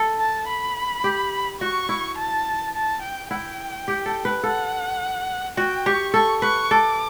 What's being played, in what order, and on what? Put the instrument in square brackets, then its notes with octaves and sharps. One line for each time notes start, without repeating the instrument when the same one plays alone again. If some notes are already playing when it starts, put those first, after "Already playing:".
Already playing: [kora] A4
[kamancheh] A5
B5
[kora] G4
[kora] F#4 [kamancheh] C#6
[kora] E4
[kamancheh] A5
A5
G5
[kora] E4 [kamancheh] G5
[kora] G4
A4
B4
[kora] A4 [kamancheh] F#5
[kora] F#4 [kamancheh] G5
[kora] G4 [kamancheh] C#6
[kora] A4 [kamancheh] C#6
[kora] B4 [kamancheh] C#6
[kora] A4 [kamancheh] D6